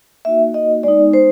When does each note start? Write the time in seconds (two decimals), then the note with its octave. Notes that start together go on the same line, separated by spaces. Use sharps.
0.25 A#3 D#4 F#4 E5
0.54 D#5
0.83 G#3 B3 D#4 D5
1.13 C5